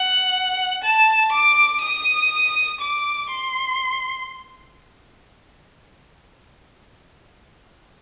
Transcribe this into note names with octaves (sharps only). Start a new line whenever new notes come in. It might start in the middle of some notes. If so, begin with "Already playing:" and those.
Already playing: F#5
A5
D6
D#6
D6
C6